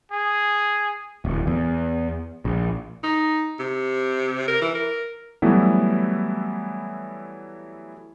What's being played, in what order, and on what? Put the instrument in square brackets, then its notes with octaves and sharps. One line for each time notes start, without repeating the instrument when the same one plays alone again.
[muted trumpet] G#4
[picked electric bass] D1
E2
A#1
[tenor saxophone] D#4
C3
A#4
E3
A#4
[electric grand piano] E3 F#3 G3 A3 B3 E4